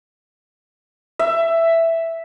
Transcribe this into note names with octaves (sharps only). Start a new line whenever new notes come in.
E5